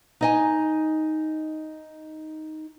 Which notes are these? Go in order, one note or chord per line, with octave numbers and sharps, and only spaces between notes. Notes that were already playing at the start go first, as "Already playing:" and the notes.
D#4 D#5 G#5